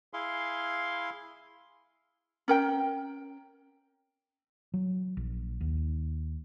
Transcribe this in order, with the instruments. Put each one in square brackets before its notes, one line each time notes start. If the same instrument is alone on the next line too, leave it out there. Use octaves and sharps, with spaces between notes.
[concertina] E4 G#4 F5 C6
[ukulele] C#4 A#4 G5
[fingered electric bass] F#3
A#1
D#2